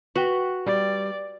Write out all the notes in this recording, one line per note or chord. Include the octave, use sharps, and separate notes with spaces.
F#4 B4 G5
G3 D5